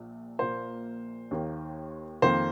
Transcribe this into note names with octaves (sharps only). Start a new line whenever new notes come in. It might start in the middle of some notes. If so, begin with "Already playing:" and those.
Already playing: A#1 A#2
A#1 A#2 A#3 C5
D#2 D#3 A#3
F2 D#3 A#3 C5